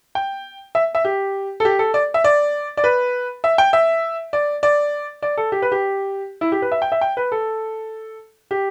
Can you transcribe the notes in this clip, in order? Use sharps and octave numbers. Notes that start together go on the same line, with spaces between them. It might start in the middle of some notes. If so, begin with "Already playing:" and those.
G5
E5
E5
G4
A4
G4
A4
D5
E5
D5
D5
B4
E5
G5
E5
D5
D5
D5
A4
G4
B4
G4
E4
G4
B4
E5
G5
E5
G5
B4
A4
G4